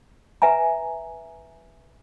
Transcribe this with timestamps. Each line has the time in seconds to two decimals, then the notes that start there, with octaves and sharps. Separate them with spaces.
0.42 B4 E5 G#5 A#5